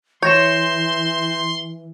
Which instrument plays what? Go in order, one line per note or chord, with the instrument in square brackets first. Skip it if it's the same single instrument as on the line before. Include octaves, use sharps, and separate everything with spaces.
[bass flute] E3 [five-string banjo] C#5 [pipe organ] C6 [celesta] G6 A#6 E7